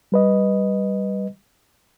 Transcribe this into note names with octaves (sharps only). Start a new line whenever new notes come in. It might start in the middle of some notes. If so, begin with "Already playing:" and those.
G3 B4 D#5